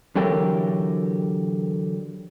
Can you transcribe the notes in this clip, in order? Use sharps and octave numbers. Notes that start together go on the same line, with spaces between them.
D3 E3 F#3 G4 A4 A#4